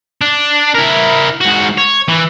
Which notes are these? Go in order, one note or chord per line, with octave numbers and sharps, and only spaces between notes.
D4
E4 A#4
G#2 F#4
C#5
E3